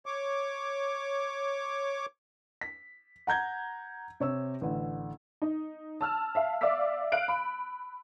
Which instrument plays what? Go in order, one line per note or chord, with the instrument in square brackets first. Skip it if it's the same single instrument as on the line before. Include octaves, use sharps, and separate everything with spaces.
[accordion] C#5 D6
[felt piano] B6
F#5 A#5 G6 G#6
C3 C#5 E6
A1 D3
[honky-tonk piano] D#4
A5 E6 F6
E5 F5 A5
D5 E5 F5 D6 E6 B6
F5 F#6 D7
B5